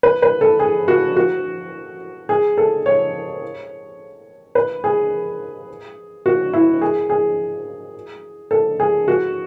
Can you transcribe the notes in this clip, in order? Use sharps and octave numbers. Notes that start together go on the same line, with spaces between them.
B4
B4
A4
G#4
F#4
F#4
G#4
A4
C#5
B4
G#4
F#4
E4
G#4
G#4
A4
G#4
F#4